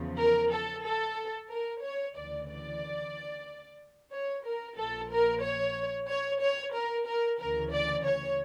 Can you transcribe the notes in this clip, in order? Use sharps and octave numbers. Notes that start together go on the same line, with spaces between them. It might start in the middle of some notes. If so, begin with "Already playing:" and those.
Already playing: E2 C#3 F3
A#4
A4
A4
A#4
C#5
D2 C#3 E3 D5
D5
C#5
A#4
A#1 A#2 F3 A4
A#4
C#5
C#5
C#5
A#4
A#4
D2 C#3 E3 A#4
D5
C#5